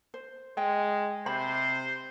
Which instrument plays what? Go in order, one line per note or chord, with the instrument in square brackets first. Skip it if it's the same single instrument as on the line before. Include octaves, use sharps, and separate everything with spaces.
[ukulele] C5
[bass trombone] G#3 [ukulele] G5
[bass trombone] C3 [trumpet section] C5 [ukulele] B5